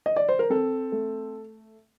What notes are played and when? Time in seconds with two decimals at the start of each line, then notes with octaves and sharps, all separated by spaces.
0.06 D#5
0.16 D5
0.29 C5
0.39 A#4
0.50 C4 A4
0.92 A3